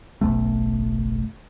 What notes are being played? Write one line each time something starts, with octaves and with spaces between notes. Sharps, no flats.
F#1 B1 A3